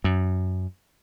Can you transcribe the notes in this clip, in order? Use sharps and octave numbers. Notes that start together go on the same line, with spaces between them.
F#2